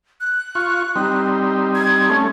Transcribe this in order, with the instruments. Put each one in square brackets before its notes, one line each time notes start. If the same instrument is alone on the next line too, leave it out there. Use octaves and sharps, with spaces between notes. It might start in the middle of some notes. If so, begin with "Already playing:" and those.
[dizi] F#6
[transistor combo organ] F4 C#6
G3 C4 D#4
[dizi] G#6
[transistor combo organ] A3 C#4